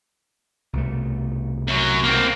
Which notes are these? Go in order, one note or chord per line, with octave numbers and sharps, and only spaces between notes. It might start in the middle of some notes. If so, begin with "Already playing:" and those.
C2 B2 A3
F#2 F#3
A#3 C4